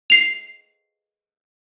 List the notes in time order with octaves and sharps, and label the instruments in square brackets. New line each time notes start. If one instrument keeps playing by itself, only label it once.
[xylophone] C7 F7